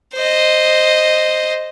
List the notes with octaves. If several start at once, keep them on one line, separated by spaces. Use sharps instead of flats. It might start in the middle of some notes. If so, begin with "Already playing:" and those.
C5 D#5